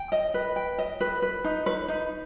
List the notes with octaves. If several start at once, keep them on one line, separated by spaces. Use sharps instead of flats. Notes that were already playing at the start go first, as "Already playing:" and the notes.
Already playing: G5
D#5
B4
G5
D#5
B4
B4
D#4
B4
D#4